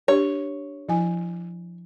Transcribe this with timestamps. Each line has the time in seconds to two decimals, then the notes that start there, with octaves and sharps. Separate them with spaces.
0.08 D4 G4 C#5
0.89 F3 E4 G#5